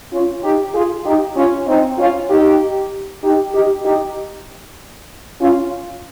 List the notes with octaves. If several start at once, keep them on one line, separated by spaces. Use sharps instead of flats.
C#4 F4
D#4 G4
F4 G#4
D#4 G4
C#4 F4
C4 D#4
C#4 F4
D#4 G4
D#4 G4
D#4 G4
D#4 G4
C#4 F4